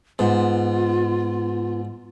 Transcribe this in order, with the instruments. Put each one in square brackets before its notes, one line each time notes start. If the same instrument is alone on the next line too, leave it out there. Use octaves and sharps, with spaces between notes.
[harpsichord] G#2 [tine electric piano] B3 [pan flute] F4